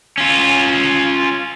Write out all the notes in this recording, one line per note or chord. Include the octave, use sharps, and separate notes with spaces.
C#4 F4